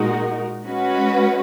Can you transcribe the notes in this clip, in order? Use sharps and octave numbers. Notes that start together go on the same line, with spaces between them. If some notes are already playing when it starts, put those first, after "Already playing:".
Already playing: A#2 G#3 D#4 F#4 A#4
G#3 C#4 F#4 B4